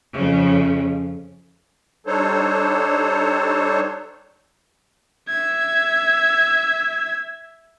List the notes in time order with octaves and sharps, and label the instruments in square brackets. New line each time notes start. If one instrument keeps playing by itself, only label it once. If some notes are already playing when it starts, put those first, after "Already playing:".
[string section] F2 C#3
[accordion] G3 D4 D#4 A4 C5 C#5
[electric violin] E5 G#6